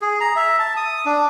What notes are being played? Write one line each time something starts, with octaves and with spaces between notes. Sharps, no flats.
G#4
A#5
E5
A5
D#6
D4